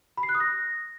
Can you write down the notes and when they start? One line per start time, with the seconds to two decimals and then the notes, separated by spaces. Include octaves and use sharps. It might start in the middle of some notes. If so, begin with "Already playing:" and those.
0.17 B5
0.23 C7
0.29 F#6
0.35 D#6
0.40 A#6